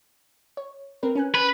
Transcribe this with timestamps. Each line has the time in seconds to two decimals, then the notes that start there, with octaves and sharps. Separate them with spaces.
0.57 C#5
1.03 C4 A#4 B4
1.15 C#4 G#5 F#6
1.35 B4